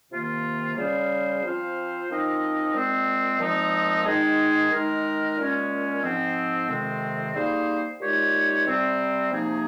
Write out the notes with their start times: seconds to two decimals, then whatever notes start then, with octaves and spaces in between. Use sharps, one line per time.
0.11 C3 D#3 A#3 F4
0.77 C#3 G3 C#4 G#4 C5
1.43 F3 C4 F4 C5 F5
2.09 F3 C4 D#4 A#4 D#5
2.75 A#2 G#3 C4
3.40 A#2 F3 G#3 C4 D#4
4.06 D#3 G#3 D#4 G#4
4.72 D#3 G#3 D#4 A#4
5.38 A#2 G#3 C#4
6.03 G#2 F3 C4
6.69 F2 C3 D#3 G#3 C4
7.35 G3 A#3 D#4 G#4 C5
8.01 A#2 G#3 D#4 G4 C#5
8.67 C3 G3 C4
9.32 C3 F3 A#3 D#4 G#4